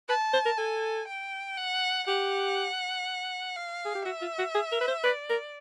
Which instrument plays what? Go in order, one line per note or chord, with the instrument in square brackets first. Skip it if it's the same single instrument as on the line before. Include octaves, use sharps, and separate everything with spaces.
[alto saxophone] B4 [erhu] A5
[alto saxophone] C5
A#4
[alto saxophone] A4 [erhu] G#5
[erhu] G5
F#5
[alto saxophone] G4 [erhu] F#5
[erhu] F5
[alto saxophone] G#4
G4
[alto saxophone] F#4 [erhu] E5
[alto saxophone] F4
F#4
G#4
A#4
B4
C5
[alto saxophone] B4 [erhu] D5
[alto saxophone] A#4